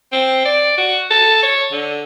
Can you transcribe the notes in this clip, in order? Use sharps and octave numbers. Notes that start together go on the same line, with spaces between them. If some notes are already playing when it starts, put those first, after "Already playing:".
C4
D5
F#4
A4
C#5
D3